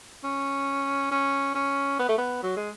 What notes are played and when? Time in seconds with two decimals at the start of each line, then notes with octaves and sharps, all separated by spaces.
0.24 C#4
1.11 C#4
1.55 C#4
1.99 B3
2.09 A3
2.18 B3
2.43 F#3
2.57 G#3